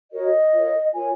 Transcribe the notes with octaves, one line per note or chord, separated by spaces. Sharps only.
F#4 A#4 C#5 D#5
F4 A#4 C#5
F4 A#4 C#5 G#5